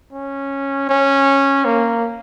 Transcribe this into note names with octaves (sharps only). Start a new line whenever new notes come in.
C#4
C#4
A#3